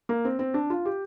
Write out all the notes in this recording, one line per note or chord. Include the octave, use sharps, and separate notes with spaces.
A#3
C4
C4
D4
F4
G4